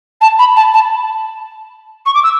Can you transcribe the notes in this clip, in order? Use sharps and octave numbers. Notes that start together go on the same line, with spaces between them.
A5
B5
A5
A5
C#6
D6
E6